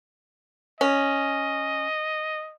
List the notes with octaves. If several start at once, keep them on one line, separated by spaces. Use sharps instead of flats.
C#4 D#5